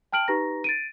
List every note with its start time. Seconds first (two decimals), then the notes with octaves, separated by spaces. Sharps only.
0.12 G5 A5 F6 D7 F#7
0.28 D#4 G4 B4 A#5 A#6
0.64 A6 D7 D#7